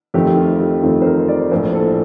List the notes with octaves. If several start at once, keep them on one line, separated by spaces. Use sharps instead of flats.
F2 D#3 A3 C4 G4
F4
G4
F2 D#3 A3 C4 A4
C5
A#4
D5
A#1 A2 A3 C5
A4